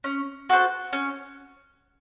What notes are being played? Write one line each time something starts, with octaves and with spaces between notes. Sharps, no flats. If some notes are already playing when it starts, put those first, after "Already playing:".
C#4
F#4 A4 C5
C#4